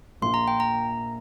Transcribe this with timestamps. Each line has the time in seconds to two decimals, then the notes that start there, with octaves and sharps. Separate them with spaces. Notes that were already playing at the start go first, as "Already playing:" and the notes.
0.22 A#1 A#2 A#3 C6
0.34 A#5
0.48 G5
0.60 A#5